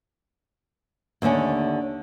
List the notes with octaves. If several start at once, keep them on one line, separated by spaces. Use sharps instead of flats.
D#2 D3 A3 C#4